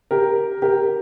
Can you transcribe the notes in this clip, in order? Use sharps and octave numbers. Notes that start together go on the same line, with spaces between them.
G4 A#4
G4 A#4